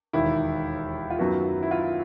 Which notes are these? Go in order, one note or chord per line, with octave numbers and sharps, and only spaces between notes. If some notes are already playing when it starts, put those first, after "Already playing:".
E1 D#2 D#3 E4
F4
F#2 D#3 F#3 B3 F#4
E4
F4